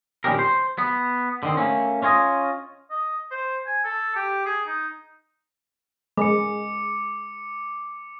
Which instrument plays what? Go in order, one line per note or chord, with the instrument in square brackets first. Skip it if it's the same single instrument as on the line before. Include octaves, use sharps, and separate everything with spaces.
[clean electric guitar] A#2 D#3 G3 C#4 G4 A#4
C5
B3
D3 D#3 C4
A3 A#3 C#4
C#4 F4 C#5 D#5
[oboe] D#5
C5
G#5
A4
G4
G#4
D#4
[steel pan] G#3 [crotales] D6 C#7